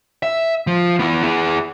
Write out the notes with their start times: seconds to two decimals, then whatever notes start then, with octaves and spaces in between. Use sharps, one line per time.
0.23 E5
0.67 F3
0.99 B3 E4
1.23 E4 G#4